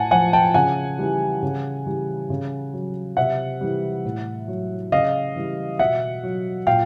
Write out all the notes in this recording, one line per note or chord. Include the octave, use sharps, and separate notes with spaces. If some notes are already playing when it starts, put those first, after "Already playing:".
Already playing: A2 F#5 G#5 A5
F3 F#5 G#5
G5 A5
C#3 F#5 G#5
E3 G3
C#3
E3 G3
C#3
F#3
C3 E5 F#5
E3 G3
A2
F#3
C#3 D#5 F5
E3 G3
B2 E5 F#5
F#3
A#2 F5 G5